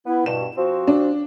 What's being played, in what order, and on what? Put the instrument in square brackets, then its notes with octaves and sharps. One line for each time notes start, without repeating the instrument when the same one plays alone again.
[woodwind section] B3 E4
[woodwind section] G2 B2 [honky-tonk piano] E7
[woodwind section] F3 C4 F#4
[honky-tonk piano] D4